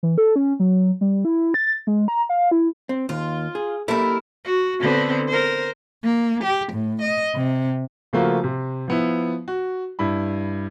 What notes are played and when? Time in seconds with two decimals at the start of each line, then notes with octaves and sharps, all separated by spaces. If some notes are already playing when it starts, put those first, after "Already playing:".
0.03 E3
0.18 A4
0.36 C#4
0.60 F#3
1.01 G3
1.25 E4
1.54 A6
1.87 G#3
2.08 A#5
2.29 F5
2.51 E4
2.89 C4
3.09 D#2 F4
3.55 G#4
3.88 A#3 E4 G4 A4 A#4
4.45 F#4
4.80 D3 B3 C4
5.28 A#4 C5
6.04 A#3
6.44 G4
6.72 A2
7.01 D#5
7.35 C3
8.13 C#3 F3 A3 A#3 F4 F#4
8.44 C3
8.88 F3 B3 E4
9.48 F#4
9.99 G2 E4 B5